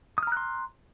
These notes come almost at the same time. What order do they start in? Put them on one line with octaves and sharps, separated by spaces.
D#6 F6 A#5 F#6 C6